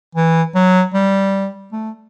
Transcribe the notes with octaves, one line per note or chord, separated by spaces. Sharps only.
E3
F#3
G3
A3